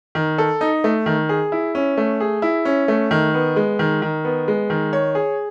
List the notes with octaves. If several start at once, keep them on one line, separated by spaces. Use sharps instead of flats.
D#3
A4
D#4
A3
D#3
G#4
E4
C#4
A3
G#4
E4
C#4
A3
D#3
B3
G#3
D#3
D#3
B3
G#3
D#3
C#5
G#4